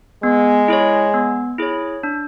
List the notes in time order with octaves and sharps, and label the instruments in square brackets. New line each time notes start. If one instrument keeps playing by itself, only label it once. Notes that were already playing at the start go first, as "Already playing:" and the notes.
[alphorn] G#3 [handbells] B3
[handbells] E4 G#4 C#5
B3
E4 G#4 C#5
D4